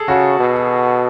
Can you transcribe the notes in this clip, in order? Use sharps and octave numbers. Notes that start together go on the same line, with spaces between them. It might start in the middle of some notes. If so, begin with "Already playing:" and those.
Already playing: G#4 A4
C#3 F#4
B2